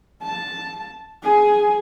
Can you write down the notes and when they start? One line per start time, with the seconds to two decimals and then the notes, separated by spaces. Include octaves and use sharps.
0.23 A5
1.23 G#4 G#5